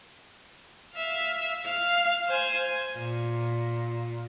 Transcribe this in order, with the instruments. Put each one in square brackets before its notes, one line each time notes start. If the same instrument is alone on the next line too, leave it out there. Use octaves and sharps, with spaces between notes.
[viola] E5 F5
F5
C5 G#5
[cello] A#2